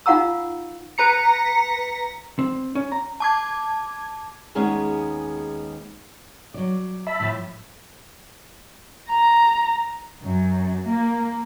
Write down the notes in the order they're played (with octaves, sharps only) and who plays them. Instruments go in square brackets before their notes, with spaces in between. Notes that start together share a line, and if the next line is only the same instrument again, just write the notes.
[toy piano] D#4 F4 F5 F#5 A#5 E6
[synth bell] B4 A#5 C#7
[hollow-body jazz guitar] C4
C#4
A#5
[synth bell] A5 D6 G#6
[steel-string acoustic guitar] D#2 G#3 B3 C#4 G#4 A#5
F#3 D5
[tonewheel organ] E5 A5 B5
[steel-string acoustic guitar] A2 F3
[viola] A#5
[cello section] F#2
A#3